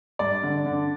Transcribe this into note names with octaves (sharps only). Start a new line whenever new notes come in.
G2 D5
D3
D3